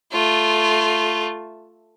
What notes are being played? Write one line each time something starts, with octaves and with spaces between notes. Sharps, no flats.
A3 F4